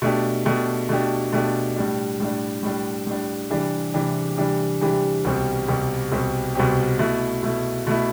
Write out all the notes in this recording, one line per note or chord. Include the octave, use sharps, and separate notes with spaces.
B2 A3 D4 G4
B2 A3 D4 G4
B2 A3 D4 G4
B2 A3 D4 G4
A2 G3 D4
A2 G3 D4
A2 G3 D4
A2 G3 D4
C3 E3 G3 D4 G4
C3 E3 G3 D4 G4
C3 E3 G3 D4 G4
C3 E3 G3 D4 G4
C2 B2 G3 C4 G4
C2 B2 G3 C4 G4
C2 B2 G3 C4 G4
C2 B2 G3 C4 G4
B2 A3 E4
B2 A3 E4
B2 A3 E4